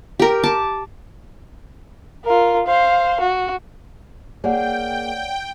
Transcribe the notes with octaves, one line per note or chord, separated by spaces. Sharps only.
G4 A#4
A5 D6
F4 A#4
C5 F5
F#4
A#3 G#4 A#4 C#5 D5 F#5 G5